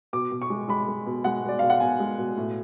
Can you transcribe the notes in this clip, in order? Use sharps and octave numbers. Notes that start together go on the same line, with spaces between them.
B2 D6
B2
C#6
G#3
G#3 B5
G#3
B2
G#3 F#5
B2 D5
B2 F5
F#5
B2 G#5
G#3
B2
A2